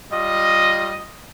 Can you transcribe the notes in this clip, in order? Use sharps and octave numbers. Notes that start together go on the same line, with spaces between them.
G3 F4 D#5